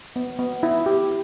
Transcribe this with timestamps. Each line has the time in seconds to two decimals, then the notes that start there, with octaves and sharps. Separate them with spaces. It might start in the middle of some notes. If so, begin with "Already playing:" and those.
0.16 B3
0.39 B3
0.63 E4
0.86 G4